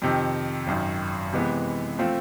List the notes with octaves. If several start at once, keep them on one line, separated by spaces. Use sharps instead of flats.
F2 C3 D#3
G#1 F#2 D#3
C3 E3 G#3 B3
F3 A3 C4 F4